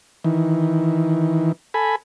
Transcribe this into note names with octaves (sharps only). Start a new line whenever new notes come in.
D#3 E3
A4 G#5 B5